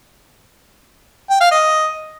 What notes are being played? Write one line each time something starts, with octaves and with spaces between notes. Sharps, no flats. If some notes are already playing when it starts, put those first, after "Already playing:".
G5
F5
D#5